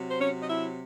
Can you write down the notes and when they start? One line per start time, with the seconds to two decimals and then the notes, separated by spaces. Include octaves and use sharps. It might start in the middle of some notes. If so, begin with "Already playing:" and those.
Already playing: C3 F#3
0.10 C5
0.21 C#4 C#5
0.43 D#5
0.49 E4 E5